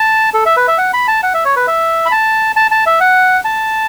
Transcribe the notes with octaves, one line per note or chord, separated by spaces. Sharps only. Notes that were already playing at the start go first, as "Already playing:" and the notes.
Already playing: A5
A4
E5
B4
E5
F#5
B5
A5
F#5
E5
C#5
B4
E5
B5
A5
A5
A5
E5
F#5
A5